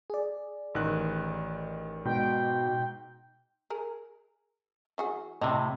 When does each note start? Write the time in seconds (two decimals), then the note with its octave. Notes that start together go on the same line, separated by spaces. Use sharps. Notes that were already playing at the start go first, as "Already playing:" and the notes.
0.10 G#4 D5
0.75 A1 D#3 F#6
2.05 G#2 B2 G5
3.70 G#4 A#4
4.98 E3 F#4 G#4
5.42 A2 C3 D#5